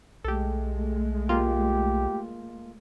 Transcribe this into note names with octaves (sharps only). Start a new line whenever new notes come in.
B1 G#3 A3 G4 A4
A#3 F4 G4